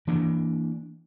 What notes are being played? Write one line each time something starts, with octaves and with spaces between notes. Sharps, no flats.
E3 A#3 D4